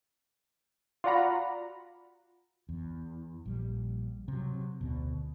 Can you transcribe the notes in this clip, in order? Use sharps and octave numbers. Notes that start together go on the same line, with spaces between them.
F4 F#4 D5 F#5 A#5 B5
E2
A#1 G3
C3 F#3
D2 B2